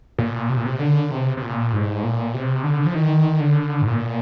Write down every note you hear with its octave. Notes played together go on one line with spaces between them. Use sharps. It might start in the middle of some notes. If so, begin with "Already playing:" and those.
A#2
C3
A#2
C3
D3
C3
C3
A#2
G#2
A#2
C3
D3
F3
D#3
D3
G#2
A#2